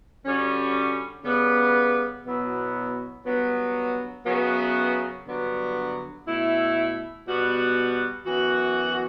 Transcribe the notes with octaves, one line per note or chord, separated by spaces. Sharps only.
D3 G3 C#4 F#4
C#3 G3 B3
B2 F#3 B3 E4
G2 F#3 B3
F#2 C#3 F#3 B3
G2 D3 F#3 B3
B2 A3 E4
B2 G3 B3 F#4
F#2 E3 B3 F#4